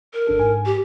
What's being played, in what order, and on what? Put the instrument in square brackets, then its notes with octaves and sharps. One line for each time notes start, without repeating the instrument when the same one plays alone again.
[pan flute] A#4
[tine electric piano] G#1 D4 A4
G#2 G#5
[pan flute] G4